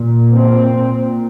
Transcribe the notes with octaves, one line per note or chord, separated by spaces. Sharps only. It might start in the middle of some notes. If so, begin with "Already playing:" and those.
Already playing: A#2
C4
A#2